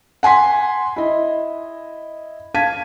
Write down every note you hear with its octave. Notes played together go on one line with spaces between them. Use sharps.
F#5 G#5 C6 B6
E4 D#5
F5 A5 G#6 B6 D#7